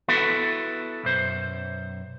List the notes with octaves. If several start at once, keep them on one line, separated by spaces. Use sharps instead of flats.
B3 E4 F#4 A4 B4
B1 F#2 C5